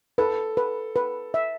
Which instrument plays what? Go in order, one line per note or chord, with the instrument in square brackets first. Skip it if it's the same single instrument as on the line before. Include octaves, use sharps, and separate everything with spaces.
[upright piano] A4 [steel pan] B4
[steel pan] B4
B4
E5